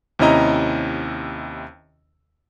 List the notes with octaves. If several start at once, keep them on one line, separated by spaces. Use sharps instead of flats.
D#2 C3 C#4 E4 D#5 A#5